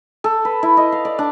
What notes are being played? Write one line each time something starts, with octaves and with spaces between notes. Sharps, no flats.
A4
B4
E4
D#5
F5
D5
D4